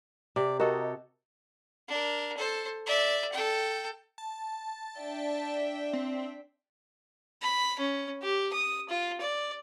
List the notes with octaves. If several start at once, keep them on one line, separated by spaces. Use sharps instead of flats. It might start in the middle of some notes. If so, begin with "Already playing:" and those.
C3 D5
F#4 G4 A4 A#4 D#5
D4 A#4
A4 C5
D5 E5
A4 G5
A5
D4 E5 G5
C4
B5
C#4
G4
D#6
F4
D5